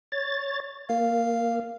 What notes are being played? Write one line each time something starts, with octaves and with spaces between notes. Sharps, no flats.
C#5 A6
A#3 F5